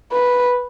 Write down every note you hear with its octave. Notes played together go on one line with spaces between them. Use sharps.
B4